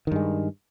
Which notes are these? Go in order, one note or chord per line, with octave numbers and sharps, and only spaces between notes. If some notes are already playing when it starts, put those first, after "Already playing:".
G2 D#3 G#3